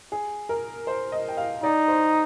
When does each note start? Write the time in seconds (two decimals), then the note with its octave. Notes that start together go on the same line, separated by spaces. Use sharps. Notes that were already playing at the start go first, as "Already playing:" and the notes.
0.12 G#4
0.49 A#4
0.87 C5
1.12 D#5
1.28 G5
1.37 F5
1.63 D#4 D5
1.88 C5